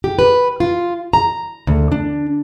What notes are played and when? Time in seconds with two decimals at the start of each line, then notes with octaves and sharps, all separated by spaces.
0.04 G4
0.19 B4
0.60 F4
1.13 A#5
1.67 D2
1.92 D4